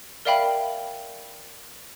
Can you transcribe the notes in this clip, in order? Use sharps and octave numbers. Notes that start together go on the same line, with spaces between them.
A#4 D5 E5 F5 G5 B5